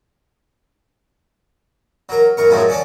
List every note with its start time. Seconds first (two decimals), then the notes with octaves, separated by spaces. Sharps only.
2.09 F#3 A#4
2.37 F#2 A#4 C#6
2.49 F#2 A2 D#3 F3 F#3 G#3
2.69 C#4 F#4 D5 A5